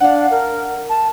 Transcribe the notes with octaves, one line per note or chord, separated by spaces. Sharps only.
D4 F5 F#5
A#4
A5